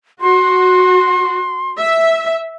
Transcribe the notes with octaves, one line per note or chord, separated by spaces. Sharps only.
F#4 C6
E5